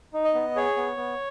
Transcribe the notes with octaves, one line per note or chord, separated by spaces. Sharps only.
D#4
D#5
B3
G#4 C#5
B3
B3